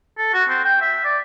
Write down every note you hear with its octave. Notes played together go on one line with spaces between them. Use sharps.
A4
F#4
C4
G5
E5
D5